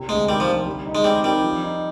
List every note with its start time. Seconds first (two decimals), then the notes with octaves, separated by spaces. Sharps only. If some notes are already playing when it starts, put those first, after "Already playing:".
Already playing: C2 C3
0.08 D2 G#3
0.29 D#3 G3
0.40 F3
0.48 D2
0.66 G3
0.86 D#4
0.95 G#3
1.04 G3 C4
1.24 D#3 G3
1.43 F3
1.62 D#4